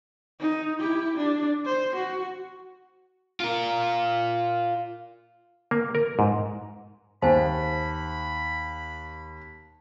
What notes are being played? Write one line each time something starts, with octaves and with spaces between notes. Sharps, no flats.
D#4
E4 G4
D4
C5
F#4
F4 A#4
A#3
A#4
G#2
D#2 C5 G#5 A5 B5